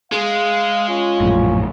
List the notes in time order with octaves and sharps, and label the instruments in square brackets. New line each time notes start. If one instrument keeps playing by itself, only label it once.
[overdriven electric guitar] G#3 [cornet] F5
[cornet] C#4 [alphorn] F4
[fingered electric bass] A#1 F#2 A2